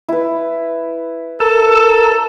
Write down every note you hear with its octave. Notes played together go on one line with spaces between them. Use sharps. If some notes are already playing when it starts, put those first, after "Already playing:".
E4 B4
A4 A#4 E6